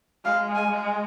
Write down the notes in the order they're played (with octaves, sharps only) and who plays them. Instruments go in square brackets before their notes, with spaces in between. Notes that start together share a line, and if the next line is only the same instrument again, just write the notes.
[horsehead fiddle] G#3 [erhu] F5
[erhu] G#5
[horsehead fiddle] G#3